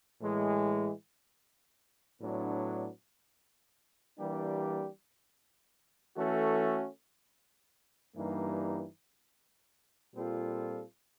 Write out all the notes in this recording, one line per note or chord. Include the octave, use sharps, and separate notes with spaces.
A2 E3 G#3
A2 F#3 B3 D4
E3 G3 A#3 D4 G4
E3 A3 C#4 F#4 A4
G2 E3 G3 A#3 D#4
A#2 G3 C4 F4 A4